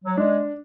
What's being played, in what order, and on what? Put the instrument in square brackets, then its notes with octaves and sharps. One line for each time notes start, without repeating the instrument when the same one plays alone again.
[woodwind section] F#3
[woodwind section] G#3 [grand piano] D4